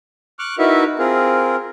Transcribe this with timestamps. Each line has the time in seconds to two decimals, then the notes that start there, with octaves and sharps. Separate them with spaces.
0.39 C#6 D6 F6 F#6
0.59 D#4 E4 F#4 A#4 B4 E5
0.99 C4 F4 G#4 A#4